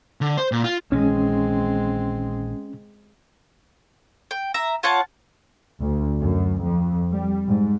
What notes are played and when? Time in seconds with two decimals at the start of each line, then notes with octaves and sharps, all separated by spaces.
0.21 D3
0.37 C5
0.52 A#2
0.64 F4
0.92 A#1 D#3 E3 G#3 C4 C#4
4.31 G5
4.54 E5 A#5
4.83 F4 C#5 F#5 A5
5.81 D2
6.18 F#2
6.61 F2
7.12 G3
7.47 G#2